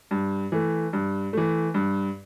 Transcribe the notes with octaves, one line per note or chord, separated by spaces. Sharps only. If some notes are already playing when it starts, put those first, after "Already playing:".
G2
E3 A3
G2
E3 A3
G2